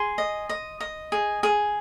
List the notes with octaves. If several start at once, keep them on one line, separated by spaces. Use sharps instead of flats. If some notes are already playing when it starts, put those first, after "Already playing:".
Already playing: G#4 C6
D#5
D#5
D#5
G#4
G#4